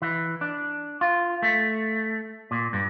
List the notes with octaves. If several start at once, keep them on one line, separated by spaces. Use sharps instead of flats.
E3
D4
F4
A3
A#2
G2